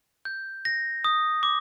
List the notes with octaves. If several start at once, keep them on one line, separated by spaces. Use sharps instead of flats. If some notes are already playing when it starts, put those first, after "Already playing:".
G6
A#6
D#6
D6